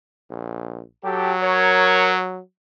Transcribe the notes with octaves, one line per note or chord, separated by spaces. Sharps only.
A#1
F#3 G4 A4
A#4 C#5